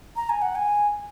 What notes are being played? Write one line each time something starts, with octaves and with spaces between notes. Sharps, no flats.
A#5
G#5
F#5
G#5